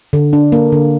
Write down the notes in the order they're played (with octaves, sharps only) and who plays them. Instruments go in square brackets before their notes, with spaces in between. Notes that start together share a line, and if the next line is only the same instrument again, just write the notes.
[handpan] D3
D4
A#3
D3